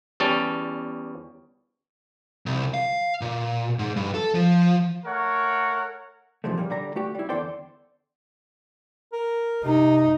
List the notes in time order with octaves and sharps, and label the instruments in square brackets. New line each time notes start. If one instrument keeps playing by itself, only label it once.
[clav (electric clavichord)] E2 G3 C#4 A5
[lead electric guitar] C2
F5
A#2
G#2
G2
A4
F3
[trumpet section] A3 A#4 C#5 F#5
[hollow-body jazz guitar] C3 E3 F3 G#3 A3
A#2 G3 A#3
D3 G3 A#5
A3 F#4 G4
G3 E4
E2 D3 A4 C5 D5 G5
[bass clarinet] A#4
[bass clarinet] C3 [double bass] D#4